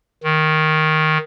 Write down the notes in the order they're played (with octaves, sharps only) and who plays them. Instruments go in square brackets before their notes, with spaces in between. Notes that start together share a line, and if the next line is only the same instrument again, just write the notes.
[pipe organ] D#3